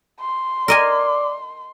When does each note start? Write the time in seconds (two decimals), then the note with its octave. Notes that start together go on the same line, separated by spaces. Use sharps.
0.20 C6
0.68 A#4 D5 D#5 G#5